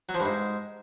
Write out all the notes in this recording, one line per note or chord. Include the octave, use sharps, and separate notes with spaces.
F#3
F3
G2
G#2